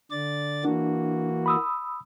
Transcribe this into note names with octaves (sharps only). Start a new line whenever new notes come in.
D3 D5 A6
E3 A#3 D4 F#4
B5 D#6 E6